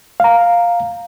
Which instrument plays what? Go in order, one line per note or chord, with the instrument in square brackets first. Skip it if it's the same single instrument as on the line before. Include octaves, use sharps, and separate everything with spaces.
[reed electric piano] F5 A#5